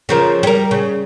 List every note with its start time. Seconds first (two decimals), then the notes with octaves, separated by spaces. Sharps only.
0.09 C#3 F3 A#4
0.43 G3 A#4
0.71 C#3